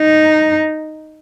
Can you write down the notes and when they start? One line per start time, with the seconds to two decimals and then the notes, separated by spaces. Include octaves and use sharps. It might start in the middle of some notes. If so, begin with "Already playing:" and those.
Already playing: D#4